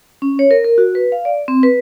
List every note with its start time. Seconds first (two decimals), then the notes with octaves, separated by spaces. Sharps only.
0.22 C#4
0.39 C#5
0.51 A#4
0.64 A#4
0.78 F#4
0.95 B4
1.12 F5
1.25 D5
1.48 C4
1.63 B4